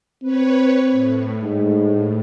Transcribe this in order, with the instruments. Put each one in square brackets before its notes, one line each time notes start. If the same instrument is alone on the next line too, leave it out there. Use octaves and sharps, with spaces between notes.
[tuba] C4 [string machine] B4 C#5
[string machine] A2
[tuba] G#2